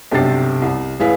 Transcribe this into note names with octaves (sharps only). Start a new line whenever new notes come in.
B1 G2 C3 G4 A6 C7
C2
A1 E4 G#4 B4 F5 B6